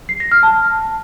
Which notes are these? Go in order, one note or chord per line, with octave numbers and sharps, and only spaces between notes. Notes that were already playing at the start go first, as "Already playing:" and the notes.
C7
A#6
F6
A5